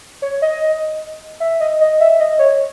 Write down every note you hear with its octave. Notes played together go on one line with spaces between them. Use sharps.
C#5
D#5
E5
D#5
D#5
E5
D#5
C#5